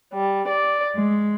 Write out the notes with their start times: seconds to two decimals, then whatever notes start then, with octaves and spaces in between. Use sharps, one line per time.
0.13 G3
0.48 D5
0.96 G#3